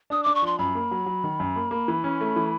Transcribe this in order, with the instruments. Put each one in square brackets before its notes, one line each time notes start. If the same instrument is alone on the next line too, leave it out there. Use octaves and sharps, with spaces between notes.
[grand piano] D4 [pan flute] D#6
[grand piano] D4 [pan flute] D6
[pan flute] C#6
[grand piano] F3 [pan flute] C6
[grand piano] F#2 [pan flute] B5
[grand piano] A#3
F#3
F#3
D#3
F#2
A#3
A#3
E3
C#4
A3
E3